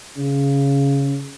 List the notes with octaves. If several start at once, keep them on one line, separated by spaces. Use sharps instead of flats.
C#3